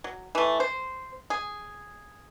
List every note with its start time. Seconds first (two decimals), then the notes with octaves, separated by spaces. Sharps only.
0.04 F#3
0.35 E3 A3
0.60 C5
1.30 G#4